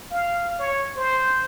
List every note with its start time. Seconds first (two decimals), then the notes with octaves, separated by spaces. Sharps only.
0.11 F5
0.59 C#5
0.97 C5